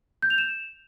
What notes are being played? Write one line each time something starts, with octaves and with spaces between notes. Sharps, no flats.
G6
F7
E7